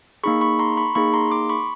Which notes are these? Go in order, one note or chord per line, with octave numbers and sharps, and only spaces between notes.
A#3 D#4 G#4 B5 C#6
B5 C#6
A#5 C6
B5 C#6
A#3 D#4 G#4 B5 C#6
A#5 C6
C6 D6
B5 C#6